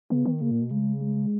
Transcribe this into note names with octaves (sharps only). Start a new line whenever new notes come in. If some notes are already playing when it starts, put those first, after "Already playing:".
C#3 B3
D#3
C#3 A#3
A#2
B2
C#3 G#3
G#3